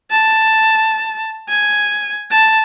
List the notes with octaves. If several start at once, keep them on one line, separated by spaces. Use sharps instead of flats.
A5
G#5
A5